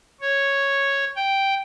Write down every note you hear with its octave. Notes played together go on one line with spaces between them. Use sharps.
C#5
G5